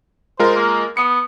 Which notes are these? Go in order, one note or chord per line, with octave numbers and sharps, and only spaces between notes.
G#3 F4 A#4 C5
A#3
B3 D#6 C#7